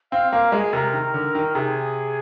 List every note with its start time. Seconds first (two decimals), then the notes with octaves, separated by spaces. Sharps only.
0.12 C4 F5
0.32 A#3 F5
0.52 G#3 G#4
0.73 C3 A#4
0.93 D#3
1.14 D3
1.35 D#3
1.55 C3 G#4